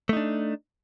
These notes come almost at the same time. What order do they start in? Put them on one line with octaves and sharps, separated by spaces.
A3 D#4 D4